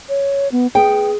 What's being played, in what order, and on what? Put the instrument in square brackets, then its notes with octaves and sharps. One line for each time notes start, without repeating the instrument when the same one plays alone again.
[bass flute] C#5
B3
[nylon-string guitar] B3 G5 [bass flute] G#4